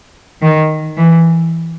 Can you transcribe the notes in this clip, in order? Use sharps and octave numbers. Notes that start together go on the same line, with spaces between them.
D#3
E3